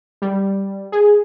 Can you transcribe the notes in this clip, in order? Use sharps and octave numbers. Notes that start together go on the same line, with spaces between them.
G3
G#4